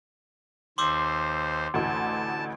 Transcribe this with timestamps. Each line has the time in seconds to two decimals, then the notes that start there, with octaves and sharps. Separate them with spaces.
0.78 D#2 C5 C6 D6 E6
1.74 A1 D2 A5